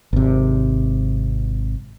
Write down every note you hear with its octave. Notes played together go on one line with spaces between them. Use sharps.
G#1 C3